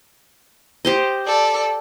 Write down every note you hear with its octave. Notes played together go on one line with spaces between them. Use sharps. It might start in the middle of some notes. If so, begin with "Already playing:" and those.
G4 C5 D#5
A4 D5